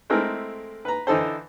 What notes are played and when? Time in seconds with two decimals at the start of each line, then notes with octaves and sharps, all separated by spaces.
0.10 G#3 A3 C4 E4 A#4
0.85 B4 A#5
1.07 D3 E3 D#4 A4 C5